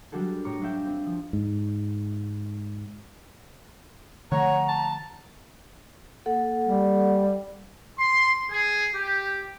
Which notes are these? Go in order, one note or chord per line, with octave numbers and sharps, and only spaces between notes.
F#3 G3 D4 F#4 G#4 A4
A2 C#5 A#5 C#6 D6 F6
G#3 D4 D5 E5 F5 G5
C4 D4
F3
G#2
D3 F3 A3 C#5 F#5 A#5
A5
A#3 A4 F#5
G3
C6
G#4
G4